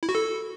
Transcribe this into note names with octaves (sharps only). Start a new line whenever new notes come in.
E4
F#4
A4